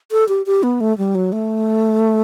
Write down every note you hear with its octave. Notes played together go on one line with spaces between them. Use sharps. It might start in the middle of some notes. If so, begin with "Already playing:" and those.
A4
G4
G4
B3
A3
G3
F#3
A3